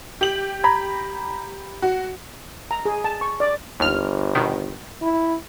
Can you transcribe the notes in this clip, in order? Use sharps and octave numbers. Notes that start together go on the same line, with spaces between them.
G4 F#7
A#5 B5 G#6
F#4
A#5
G#4
A5
C#6
D5
G1 D#2 F6
B2 D#3
E4